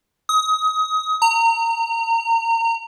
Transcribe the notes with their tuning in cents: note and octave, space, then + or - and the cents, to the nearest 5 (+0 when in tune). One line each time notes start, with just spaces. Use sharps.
D#6 +25
A#5 -30